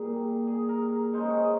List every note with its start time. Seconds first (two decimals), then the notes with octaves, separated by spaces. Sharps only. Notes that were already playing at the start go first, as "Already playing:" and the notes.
Already playing: A#2 G3 A#3 G#4
0.47 G#4
0.69 A#4
1.13 C#3 G#3 D#4 C5
1.29 C#5
1.44 D#5